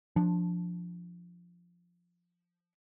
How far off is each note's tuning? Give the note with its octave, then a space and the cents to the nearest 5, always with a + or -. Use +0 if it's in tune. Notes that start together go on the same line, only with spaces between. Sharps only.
F3 +0 D4 +0